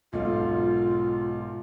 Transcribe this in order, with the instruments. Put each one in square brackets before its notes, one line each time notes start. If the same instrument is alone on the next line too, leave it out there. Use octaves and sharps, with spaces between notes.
[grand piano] B1 G#2 A4 [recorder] F4